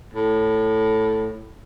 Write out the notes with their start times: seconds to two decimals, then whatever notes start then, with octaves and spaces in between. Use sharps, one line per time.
0.13 A2